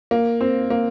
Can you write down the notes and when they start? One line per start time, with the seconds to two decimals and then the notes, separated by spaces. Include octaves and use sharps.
0.11 A#3
0.41 C4
0.70 A#3